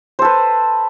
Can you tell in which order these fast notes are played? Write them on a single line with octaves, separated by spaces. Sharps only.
C5 A4 B4